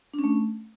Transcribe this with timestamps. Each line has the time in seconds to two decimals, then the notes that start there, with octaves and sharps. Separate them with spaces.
0.14 D4
0.19 C#4
0.24 A3